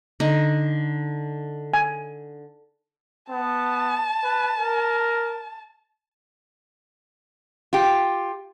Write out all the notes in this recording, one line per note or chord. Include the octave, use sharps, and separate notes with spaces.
D3 D#4
G#5
B3 A5
B4
A#4
F4 G4